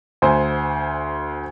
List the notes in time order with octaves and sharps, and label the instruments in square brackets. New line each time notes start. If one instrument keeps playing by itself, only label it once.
[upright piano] D2 C5 G#5